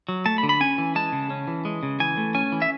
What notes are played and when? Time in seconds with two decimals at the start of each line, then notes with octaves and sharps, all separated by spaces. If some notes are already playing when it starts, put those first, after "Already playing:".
0.08 F#3
0.26 A3 A5
0.38 B5
0.43 D3
0.49 B5
0.60 C#4 G#5
0.78 E3
0.95 G#3 A5
1.13 C#3
1.30 C#4
1.47 E3
1.65 G#3
1.83 C#3
2.00 E3 G#5
2.17 A3
2.35 C#4 G#5
2.52 E3
2.62 E5